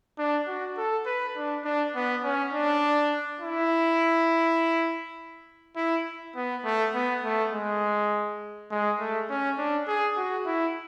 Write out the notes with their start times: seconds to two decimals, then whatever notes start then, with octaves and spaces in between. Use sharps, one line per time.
0.18 D4
0.48 F#4
0.77 A4
1.06 B4
1.36 D4
1.65 D4
1.95 B3
2.24 C#4
2.53 D4
3.41 E4
5.76 E4
6.36 B3
6.64 A3
6.94 B3
7.24 A3
7.52 G#3
8.71 G#3
8.99 A3
9.29 C#4
9.58 D4
9.87 G#4
10.17 F#4
10.46 E4